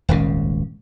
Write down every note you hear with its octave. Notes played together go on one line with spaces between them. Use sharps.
D#1 G#1 C#2 C#3